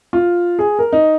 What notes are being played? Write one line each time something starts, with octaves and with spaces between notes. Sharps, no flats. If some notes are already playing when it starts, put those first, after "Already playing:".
F4
G#4
A#4
D#4